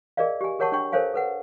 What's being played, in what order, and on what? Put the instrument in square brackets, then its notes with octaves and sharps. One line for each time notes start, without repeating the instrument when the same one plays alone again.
[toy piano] G#4 A#4 D5 D#5 F5
G4 G#5
G#4 A#4 C#5 F#5 A5 C#6
D4 G5 C#6
A4 A#4 C5 C#5 F5 G#5
A4 B4 F#5